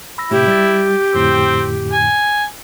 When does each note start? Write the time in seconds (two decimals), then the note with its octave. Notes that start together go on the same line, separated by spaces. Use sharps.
0.18 B5 E6 A#6
0.31 A2 C3 E4 G4
0.47 G3 A6
1.15 F2 A2 D3 C4
1.93 G#5